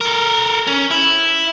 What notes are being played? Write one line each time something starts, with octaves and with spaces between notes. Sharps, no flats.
A4 A#4
C#4
E4